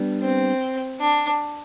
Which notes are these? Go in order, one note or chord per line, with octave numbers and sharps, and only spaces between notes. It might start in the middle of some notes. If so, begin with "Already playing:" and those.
Already playing: G3 B3 D4
C4
D4